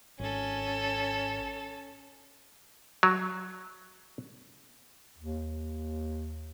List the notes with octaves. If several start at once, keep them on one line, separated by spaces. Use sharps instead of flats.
G#1 C#4 A4
F#3
D#2